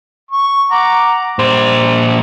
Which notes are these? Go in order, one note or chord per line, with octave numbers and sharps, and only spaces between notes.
C#6
F#5 A#5 D6
A#2 G3 C5